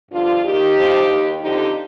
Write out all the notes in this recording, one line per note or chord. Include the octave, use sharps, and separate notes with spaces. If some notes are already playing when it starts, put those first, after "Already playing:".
G2 D3 F3 D4 F4
D#2 D#3 D#4 G4
G2 F3
D#2
D#3
F2 D3 F3 D#4 G4